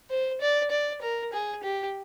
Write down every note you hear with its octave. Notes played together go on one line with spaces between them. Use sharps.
C5
D5
D5
A#4
G#4
G4